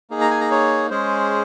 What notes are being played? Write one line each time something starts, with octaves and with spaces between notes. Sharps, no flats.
A#3 D#4 G#4
A#5
G#5
A#5
C#5
G#3 C#4 G#4 C5